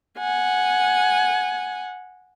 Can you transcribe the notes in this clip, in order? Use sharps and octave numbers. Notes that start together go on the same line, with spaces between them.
F#5 G#5